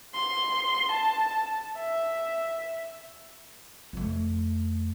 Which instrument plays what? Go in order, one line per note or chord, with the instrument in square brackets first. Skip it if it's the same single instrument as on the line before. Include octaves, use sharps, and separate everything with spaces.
[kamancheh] C6
A5
E5
[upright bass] F2 A3